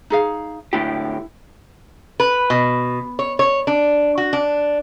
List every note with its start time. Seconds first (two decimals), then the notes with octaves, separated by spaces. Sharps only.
0.10 D#4 G#4 F5
0.73 A2 D3 E4 G4
2.20 B4
2.50 B2
3.19 C#5
3.39 C#5
3.67 D4
4.18 F#4
4.33 D4